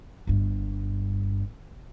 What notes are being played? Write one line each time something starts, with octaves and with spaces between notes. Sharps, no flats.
G1 G2